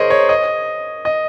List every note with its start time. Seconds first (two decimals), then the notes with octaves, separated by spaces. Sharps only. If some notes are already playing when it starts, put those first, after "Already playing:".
Already playing: G#4 A#4 C5 C#5 D#5
0.10 C#5
0.29 D#5
1.05 D#5